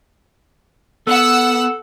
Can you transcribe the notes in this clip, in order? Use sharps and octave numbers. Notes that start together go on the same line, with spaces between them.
B3 A4 F#5 E6